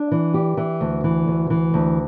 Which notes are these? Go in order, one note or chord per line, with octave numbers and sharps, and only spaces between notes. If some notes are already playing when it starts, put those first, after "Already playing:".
Already playing: D4
E3
G4
E3
D2
E3
D2
E3
D2